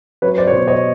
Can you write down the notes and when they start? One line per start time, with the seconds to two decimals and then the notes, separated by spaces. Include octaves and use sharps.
0.22 F#3 B4 C#5
0.38 C5 D5
0.47 C#5
0.52 B2 C5 D5
0.67 C#5 D#5